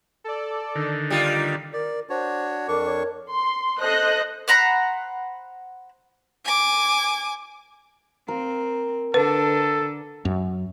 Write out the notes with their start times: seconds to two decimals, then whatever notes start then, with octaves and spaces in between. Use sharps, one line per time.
0.24 A4 D5
0.75 D3 D#3
1.10 G3 D#4 F4 D5
1.73 A#4 D5
2.10 D4 F#4 C5 C#5
2.68 F2 D4 A#4 C#6 D6
2.86 C#5
3.32 C6
3.79 A4 C5 D#5 F#6 A#6
4.48 C5 F#5 A#5 B5
6.45 G#5 D6
8.28 C4 A#4
9.14 D3 D4 A4 B4
10.25 F#2